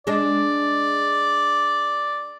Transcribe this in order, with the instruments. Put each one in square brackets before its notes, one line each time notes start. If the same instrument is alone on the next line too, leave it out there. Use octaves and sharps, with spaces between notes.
[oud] G#3 D4 [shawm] D5